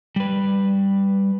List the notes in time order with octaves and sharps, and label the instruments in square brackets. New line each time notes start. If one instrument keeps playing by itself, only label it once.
[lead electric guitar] G3 B4